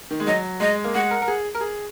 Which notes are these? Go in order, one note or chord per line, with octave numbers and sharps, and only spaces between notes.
D#3
G#3
F#3 D#5
G#3 D#5
A#3
G#3 F#5
A#4
A#4
G#4
A#4
G#4